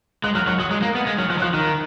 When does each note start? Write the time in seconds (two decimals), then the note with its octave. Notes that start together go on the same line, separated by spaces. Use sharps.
0.24 G#3 F#6
0.35 F#3 F6
0.47 F#3 F#6
0.60 F#3 D#6
0.71 G#3
0.82 A#3
0.95 B3
1.07 G#3
1.19 F#3 F6
1.30 F3 F#6
1.39 F#3
1.42 F3 F#6
1.53 D#3 F6